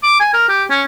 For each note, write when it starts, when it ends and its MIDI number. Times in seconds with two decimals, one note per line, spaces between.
0.03 0.20 86
0.20 0.30 80
0.34 0.46 70
0.49 0.64 67
0.70 0.82 61